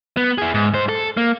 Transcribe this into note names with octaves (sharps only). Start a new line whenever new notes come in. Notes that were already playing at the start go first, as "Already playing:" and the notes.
B3
E4 G#4
G#2
G#2 C5
A4
A#3